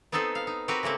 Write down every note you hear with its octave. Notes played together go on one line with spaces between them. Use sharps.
B3 C4 D#4 A4 B4 C5
F5
D#4
C4 F#4 G4 A#4 B4
C#3 A3 A#3 C4